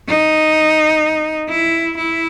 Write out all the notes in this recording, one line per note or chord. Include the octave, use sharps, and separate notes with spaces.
D#4
E4
E4